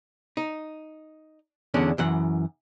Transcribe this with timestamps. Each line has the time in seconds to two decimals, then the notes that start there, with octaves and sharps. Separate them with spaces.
0.37 D#4
1.74 E2 D3 C#4 D4
1.98 F#2 E3 F#5